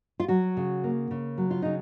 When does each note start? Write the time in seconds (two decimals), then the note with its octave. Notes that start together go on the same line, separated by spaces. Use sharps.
0.20 F4
0.28 F#3 F#4
0.57 C#3
0.84 A#3
1.11 C#3
1.38 F#3
1.51 F4
1.62 C#3 D#4